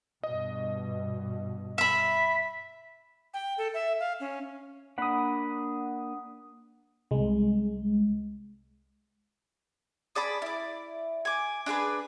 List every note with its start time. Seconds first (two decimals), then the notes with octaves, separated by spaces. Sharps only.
0.23 G2 B2 D#5
1.78 E5 B5 B6
3.34 G5
3.58 A4
3.74 E5
4.00 F5
4.20 C#4
4.98 A#3 D4 F#5 B5 D#6
7.11 C2 G#3
10.15 G#4 D5 A5 B5
10.42 E4 D5
11.25 G#5 D6
11.66 D4 G#4 A#4 B4